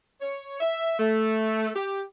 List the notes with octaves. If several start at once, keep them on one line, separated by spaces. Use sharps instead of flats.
C#5
E5
A3
G4